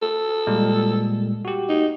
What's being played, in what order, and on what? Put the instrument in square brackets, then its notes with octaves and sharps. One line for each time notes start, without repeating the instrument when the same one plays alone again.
[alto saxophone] A4
[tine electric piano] A#2 G3 G#3
F#4 G4
[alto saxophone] D#4